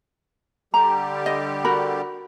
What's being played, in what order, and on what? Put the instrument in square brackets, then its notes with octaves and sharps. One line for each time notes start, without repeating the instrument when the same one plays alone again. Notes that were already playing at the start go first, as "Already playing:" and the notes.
[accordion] D3 G3 G4 [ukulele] A#5
[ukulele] D#5
F#4 A#4 B5